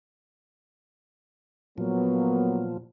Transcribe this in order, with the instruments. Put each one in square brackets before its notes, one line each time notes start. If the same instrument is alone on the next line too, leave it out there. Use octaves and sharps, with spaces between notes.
[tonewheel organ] A#2 F3 [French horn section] F#3 A#3 B3